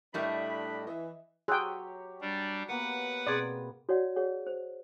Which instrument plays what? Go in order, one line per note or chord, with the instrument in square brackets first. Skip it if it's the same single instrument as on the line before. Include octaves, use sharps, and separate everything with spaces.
[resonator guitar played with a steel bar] A2 G3 A3 [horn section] D4 D#5 B5 [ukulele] A#4 E5
[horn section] E3 [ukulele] D#5 E5
[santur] F#3 G4 C#5 [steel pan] G#4 G5 [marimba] C6 E6 F#6
[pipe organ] G3 D4
[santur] A#3 B3 [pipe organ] B4 F#5
[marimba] B2 C4 G#4 [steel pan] D5
[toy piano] F#4 C#5 D5 F#5
G#4 C#5 F#5
C5